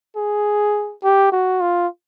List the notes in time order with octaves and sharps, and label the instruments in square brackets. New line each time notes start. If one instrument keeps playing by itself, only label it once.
[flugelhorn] G#4
G4
F#4
F4